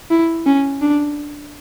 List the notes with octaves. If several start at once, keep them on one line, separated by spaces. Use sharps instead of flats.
E4
C#4
D4